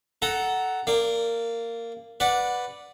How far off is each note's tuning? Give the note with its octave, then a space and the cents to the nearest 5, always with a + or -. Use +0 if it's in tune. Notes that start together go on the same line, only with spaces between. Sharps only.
A4 -10 F#5 +10 A#5 +0
A#3 -15 D5 +0
B4 +0 D5 +0 F#5 -15